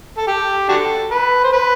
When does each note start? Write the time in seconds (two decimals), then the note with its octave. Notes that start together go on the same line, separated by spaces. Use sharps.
0.18 A4
0.27 G4
0.69 D4 F#4 A4
1.11 B4
1.44 C5
1.53 B4